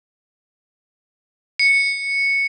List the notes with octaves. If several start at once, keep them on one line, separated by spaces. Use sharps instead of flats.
C#7